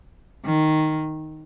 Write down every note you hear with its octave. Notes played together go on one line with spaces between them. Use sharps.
D#3